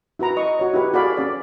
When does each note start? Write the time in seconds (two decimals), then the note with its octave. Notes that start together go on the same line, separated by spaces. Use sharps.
0.19 E4 F#4 B4 A#5
0.37 D#5 C#6
0.59 F#4 C#5
0.74 E4 F#4 G4 B4
0.94 F#4 G#4 A4 D5 F5 B5
1.17 C#4 D5